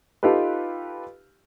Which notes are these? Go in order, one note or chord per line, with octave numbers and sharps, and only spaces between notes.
D#4 F4 G4 A4 B4